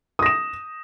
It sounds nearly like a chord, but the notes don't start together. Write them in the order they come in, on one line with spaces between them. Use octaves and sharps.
D#6 A#6 E7